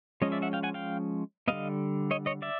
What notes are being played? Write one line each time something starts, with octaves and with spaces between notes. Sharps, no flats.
F3 G#3 C#4 C#5 D#5
D5 E5
E5 F#5
F5 G5
F#5 G#5
F5 G5
D3 G3 B3 D#5 F5
C#5 D#5
C#5 D#5
D5 E5